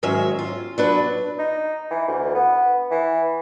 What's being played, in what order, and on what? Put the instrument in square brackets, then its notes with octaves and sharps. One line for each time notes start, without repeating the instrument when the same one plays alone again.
[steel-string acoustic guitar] G#2 D#3 F#3 C#4 E5
F4
F#3 D4 B4
[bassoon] D#4
E3
D2
B3
E3